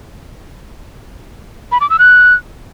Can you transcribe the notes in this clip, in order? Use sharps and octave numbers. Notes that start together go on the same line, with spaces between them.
B5
D6
E6
F#6